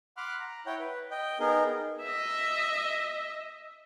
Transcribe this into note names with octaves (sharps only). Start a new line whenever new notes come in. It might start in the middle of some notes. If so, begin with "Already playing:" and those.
F#5 B5 C6 D6 F6 F#6
A#5
E4 C#5 F#5 G5
B4
D#5 G5
B3 D#4 G#4 A#4
D#5 E5